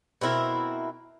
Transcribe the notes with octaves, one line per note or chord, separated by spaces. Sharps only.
B2 C4 E4 A#4